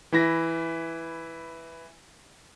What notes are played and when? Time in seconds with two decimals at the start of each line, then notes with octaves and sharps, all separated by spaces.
0.12 E3 E4 A#6